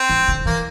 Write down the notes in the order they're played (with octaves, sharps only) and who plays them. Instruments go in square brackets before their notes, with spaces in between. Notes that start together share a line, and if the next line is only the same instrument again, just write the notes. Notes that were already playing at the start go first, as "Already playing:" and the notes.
Already playing: [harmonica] C4
[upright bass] E3
D3
[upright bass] E3 [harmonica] A#3